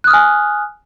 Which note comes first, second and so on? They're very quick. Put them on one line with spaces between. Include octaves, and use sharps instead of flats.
F#6 D#6 F6 G#5